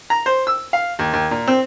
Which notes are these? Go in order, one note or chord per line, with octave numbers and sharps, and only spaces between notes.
A#5
C5
E6
F5
D#2
D#2
A#2
C4